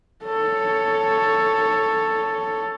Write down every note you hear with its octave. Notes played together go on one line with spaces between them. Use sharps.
A4 C#5